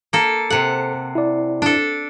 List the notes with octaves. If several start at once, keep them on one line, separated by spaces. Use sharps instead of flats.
A#3 A4
C3 A4 F#5
E4 D5
D4 A4